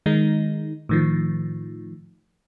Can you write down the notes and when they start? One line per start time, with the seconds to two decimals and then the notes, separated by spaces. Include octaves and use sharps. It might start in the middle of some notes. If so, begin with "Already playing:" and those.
0.06 D#3 G#3 D#4
0.89 A2 D#3 F3